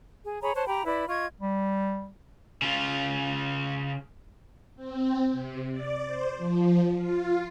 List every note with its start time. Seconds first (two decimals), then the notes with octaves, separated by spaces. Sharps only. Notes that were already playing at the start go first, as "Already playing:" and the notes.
0.24 G#4
0.41 G#4 C#5 A#5 B5
0.55 C5 C#5 A5 F#6
0.68 G4 G5 A#5 B5
0.85 E4 B4 D5 B5
1.09 F4 D#5 C#6 G#6
1.41 G3
2.62 C#3 F4
4.76 C4
5.32 C3
5.71 D5
6.06 C5
6.37 F3
6.97 F4